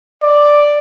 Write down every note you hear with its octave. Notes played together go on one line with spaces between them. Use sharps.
D5